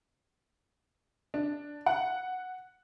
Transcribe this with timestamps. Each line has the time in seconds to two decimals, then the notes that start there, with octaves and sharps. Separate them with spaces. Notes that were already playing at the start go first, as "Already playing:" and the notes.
1.34 D4
1.86 F#5